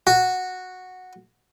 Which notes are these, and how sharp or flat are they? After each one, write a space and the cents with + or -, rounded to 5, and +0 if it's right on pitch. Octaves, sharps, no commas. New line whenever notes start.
F#4 -5